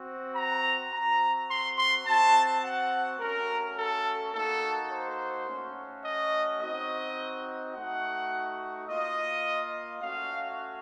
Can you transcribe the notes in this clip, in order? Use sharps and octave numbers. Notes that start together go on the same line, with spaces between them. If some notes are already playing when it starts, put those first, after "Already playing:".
Already playing: C4 F#4
A#5
C4 F#4 A#5
C6
C6
C4 F#4 A5
F#5
A3 C#4 F#4 A#4
A4
A#3 D#4 F#4 A4
C5
A3 C#4 F#4
D#5
C4 D#4 F#4 D#5
A3 D#4 F#4 F#5
A#3 F4 D#5
A3 C#4 F#4 F5